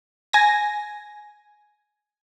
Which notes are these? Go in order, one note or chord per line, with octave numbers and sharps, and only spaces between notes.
G#5 A#6